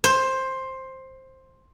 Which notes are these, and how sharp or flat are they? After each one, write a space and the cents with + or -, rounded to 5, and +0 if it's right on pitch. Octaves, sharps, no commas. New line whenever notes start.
C5 +10